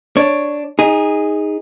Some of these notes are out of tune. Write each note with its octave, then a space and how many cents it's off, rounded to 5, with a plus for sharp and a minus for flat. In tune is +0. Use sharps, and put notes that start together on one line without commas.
D4 +0 C#5 +0
D#4 +10 G#4 -15